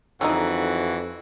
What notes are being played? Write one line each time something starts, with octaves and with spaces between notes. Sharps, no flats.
F2 D3 E3 G#3 D#4 F#4